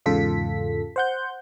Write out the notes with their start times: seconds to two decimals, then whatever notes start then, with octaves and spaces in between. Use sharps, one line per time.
0.06 E2 G#2 C#3 F4 A4 B6
0.96 C5 F#5 G6